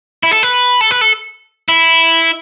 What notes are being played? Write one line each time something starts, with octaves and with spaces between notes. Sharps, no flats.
E4
A4
B4
A4
B4
A4
E4